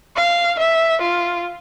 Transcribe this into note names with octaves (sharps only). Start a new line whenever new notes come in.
F5
E5
F4